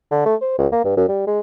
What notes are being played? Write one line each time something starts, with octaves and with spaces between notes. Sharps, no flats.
D3
A3
C5
C#2
A#3
G2
F#2
G3
G#3